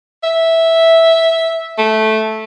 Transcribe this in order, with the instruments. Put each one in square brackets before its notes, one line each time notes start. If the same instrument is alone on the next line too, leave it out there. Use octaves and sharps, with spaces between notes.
[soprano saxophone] E5
A3